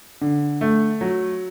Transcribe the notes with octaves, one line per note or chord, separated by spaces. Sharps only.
D3
A3
F#3